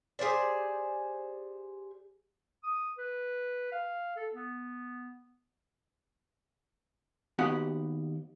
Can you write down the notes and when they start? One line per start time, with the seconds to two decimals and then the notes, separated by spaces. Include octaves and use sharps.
0.19 G4 G#4 C5 D5
2.63 D#6
2.98 B4
3.72 F5
4.16 A4
4.33 B3
7.39 D#2 B3 F#4 G4 F#5